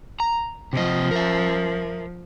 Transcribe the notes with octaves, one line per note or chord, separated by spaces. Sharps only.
A#5
C3 F3 D#5
A#4 E5